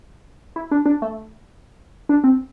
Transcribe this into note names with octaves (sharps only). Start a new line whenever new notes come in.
E4
D4
D4
A3
D4
C4